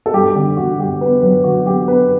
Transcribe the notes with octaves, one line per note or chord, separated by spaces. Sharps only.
A4
G2 G4
D3 G4
D3 F#4
G2 G4
B3 B4
F#3 B4
D3 F#4
F#3 G4
B3 B4